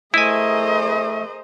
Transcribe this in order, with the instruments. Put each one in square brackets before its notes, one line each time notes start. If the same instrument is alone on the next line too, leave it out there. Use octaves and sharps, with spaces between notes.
[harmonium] A3 [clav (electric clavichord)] E4 G#5 [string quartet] G#4 A#4 C5 [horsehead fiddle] D#5